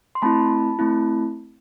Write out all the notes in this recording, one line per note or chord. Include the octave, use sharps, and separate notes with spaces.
C6
A3 C4 E4 A5 B5
A3 C4 E4